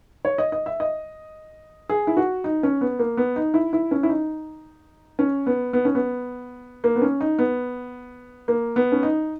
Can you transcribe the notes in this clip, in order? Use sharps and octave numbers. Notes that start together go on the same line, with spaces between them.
C#5
D#5
D#5
E5
D#5
G#4
E4
F#4
D#4
C#4
B3
A#3
B3
D#4
E4
E4
C#4
E4
D#4
C#4
B3
B3
C#4
B3
A#3
B3
C#4
D#4
B3
A#3
B3
C#4
D#4